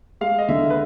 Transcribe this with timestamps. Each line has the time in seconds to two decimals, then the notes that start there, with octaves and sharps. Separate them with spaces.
0.21 G#3 F5
0.38 D#5
0.49 D3 E5
0.70 B4